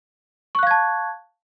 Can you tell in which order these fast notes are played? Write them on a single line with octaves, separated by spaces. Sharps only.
C#6 F#6 F5 G#6 A5